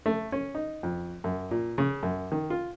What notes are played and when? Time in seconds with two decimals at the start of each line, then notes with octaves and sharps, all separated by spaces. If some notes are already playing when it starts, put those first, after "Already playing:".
0.06 A3
0.32 C#4
0.55 D#4
0.83 F2
1.24 F#2
1.51 A#2
1.78 C#3
2.03 F#2
2.32 D#3
2.50 F4